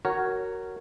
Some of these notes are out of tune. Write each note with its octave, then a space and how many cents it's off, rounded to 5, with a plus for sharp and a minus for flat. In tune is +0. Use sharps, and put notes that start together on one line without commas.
F#4 +15 A#4 -10 C#5 +0